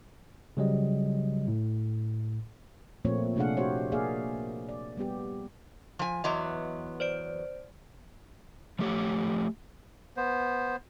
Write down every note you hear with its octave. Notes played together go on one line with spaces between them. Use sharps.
C#3 F#3 G3 D#5
A2
A#2 F3 A3 A#3 C4 C#5
C3 A3 D4 G#4 F5 F#5
F#4 G4 C5 C#5
A#3 G#4 D5 E5 F5
D5
G3 B3 G4
F3 G#5
E2 F#3 B3 D#5 C6
C5 D5 D7
F3 A3 G4 C#5
B3 C5